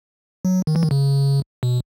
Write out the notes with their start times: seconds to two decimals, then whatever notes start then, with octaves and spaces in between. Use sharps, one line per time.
0.45 F#3
0.67 D#3
0.76 E3
0.83 D#3
0.91 C#3
1.63 B2